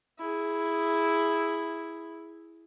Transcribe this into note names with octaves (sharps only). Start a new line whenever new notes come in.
E4 G#4